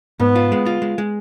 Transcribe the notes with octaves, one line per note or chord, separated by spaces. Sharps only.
G#2 B3
F4
G#3
F4
G#3
G#3